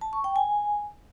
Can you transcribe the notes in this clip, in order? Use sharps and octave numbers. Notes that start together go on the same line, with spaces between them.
A5
C#6
G5
G#5